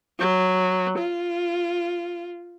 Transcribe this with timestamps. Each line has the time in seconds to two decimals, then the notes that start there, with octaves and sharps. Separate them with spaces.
0.19 F#3
0.98 F4